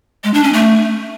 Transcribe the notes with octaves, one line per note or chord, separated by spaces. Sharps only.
G#3
D4
C#4
A3